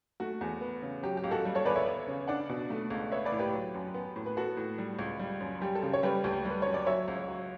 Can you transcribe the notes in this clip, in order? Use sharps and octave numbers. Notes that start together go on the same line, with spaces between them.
A3 F#4
E2
B3
C#3
F#3 G4
G4
C#2
F#4 A4
G3
A4 C#5
E2 B4 D5
C#5 E5
B3
C#3
D4 D5 F#5
B2
A3
C#2
B3 C#5 E5
B4 D5
A2
G4 B4
F#3
F#2
B3
A2
B4
B3 F#4 A4
A2
G3
C#2
G3
F#2
G3 G4
A4
C#3 G4
C#5
G3 G4 B4
D2 G4
G3 B4
F#2 C#5
D5
F#3 C#5 E5
C#2
F#3